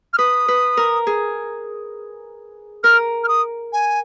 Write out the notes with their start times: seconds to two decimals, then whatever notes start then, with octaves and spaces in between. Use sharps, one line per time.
0.13 F6
0.18 B4 D#6
0.48 B4
0.77 A#4
1.07 G#4
2.84 A#4 F6
3.24 F6
3.28 D#6
3.73 G#5